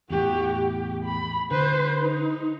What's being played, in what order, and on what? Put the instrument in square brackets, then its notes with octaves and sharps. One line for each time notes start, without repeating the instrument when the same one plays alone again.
[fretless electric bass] E2 A2 [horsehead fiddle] F#4 G4
[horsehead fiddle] G4
B5
[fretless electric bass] D3 [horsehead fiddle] B4 C5
[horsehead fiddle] D#4